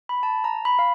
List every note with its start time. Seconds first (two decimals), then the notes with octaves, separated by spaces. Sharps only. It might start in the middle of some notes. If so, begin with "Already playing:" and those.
0.09 B5
0.23 A5
0.44 A#5
0.65 B5
0.79 F5